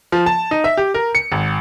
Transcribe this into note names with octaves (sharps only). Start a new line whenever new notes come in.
F3
A5
D#4
E5
G4
A#4
C#7
G#1